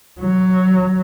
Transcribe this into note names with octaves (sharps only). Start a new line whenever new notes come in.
F#3